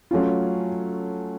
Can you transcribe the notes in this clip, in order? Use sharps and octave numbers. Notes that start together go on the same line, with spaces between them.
F#3 A3 C#4 F4